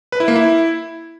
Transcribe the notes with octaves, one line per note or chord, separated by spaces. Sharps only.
B4
E4
A#3
E4